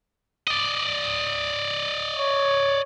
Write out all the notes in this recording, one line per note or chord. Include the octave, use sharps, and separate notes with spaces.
D5 D#5
C#5